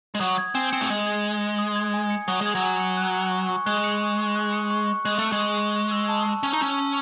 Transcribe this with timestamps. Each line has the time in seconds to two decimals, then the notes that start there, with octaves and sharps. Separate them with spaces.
0.15 G#3
0.20 F#3 D#6
0.38 G#6
0.55 C4 G#5
0.72 C4 C#7
0.81 A3
0.90 G#3 D#6
1.06 G#6
1.24 G#5
1.41 C#7
1.59 D#6
1.76 G#6
1.94 G#5
2.10 C#7
2.28 F#3 D#6
2.41 G#3 G#6
2.55 F#3
2.63 G#5
2.80 C#7
2.97 F#6
3.15 C#7
3.31 C#6
3.49 C#6
3.66 G#3 F#6
3.84 C#7
4.01 C#6
4.18 C#6
4.36 F#6
4.53 C#7
4.70 C#6
4.88 C#6
5.05 G#3 F#6
5.19 A3 C#7
5.32 G#3
5.39 C#6
5.57 C#6
5.74 C#6
5.91 E6
6.09 A5
6.26 A5
6.43 C#4 C#6
6.53 D#4
6.60 C#4 E6
6.78 A5